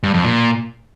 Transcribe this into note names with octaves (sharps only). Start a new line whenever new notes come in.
G2
F2
A#2